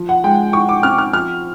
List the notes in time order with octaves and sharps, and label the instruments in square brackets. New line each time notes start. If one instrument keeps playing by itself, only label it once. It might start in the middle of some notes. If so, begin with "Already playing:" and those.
Already playing: [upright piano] F3
F#5
G#3 G5
E4 C#6
D6
C4 F6
F6
F3 F6